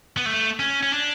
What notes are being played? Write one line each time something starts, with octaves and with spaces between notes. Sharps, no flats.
B3
A3
C#4
C#4
D4